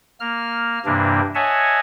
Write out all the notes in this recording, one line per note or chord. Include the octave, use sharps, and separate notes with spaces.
A#3 F6
G2 C3 E3 A#3 D4
C#5 D#5 E5 F#5 G#5 A5